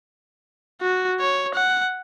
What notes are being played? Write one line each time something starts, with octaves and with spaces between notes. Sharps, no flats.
F#4
C#5
F#5